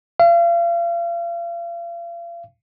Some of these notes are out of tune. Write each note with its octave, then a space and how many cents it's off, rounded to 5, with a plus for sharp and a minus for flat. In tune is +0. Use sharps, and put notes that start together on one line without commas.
F5 -35